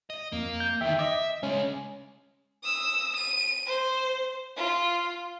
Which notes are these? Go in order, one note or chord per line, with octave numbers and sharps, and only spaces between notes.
D#5
F2 A#3
G6
E2 D#3 E5 G5
D#5 E5 D6
C#2 G#3 C#4
D#6 E6
D#7
C5
F4